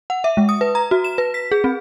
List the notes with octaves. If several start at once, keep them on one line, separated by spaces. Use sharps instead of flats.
F#5
E5
G#3
D#6
B4
A#5
F#4
E7
B4
B6
G#4
C4